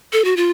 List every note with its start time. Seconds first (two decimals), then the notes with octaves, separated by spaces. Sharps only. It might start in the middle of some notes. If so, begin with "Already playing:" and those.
0.13 A4
0.25 F#4
0.37 F4